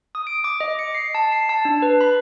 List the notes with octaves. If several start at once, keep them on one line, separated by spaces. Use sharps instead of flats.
D#6
D7
D6
D#5
C#7
C7
A5
C7
A5
D4
B4
B5